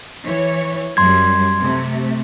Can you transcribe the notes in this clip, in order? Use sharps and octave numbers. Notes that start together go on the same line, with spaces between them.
E3 C#5
F#2 G3 C6 G#6
C3 A3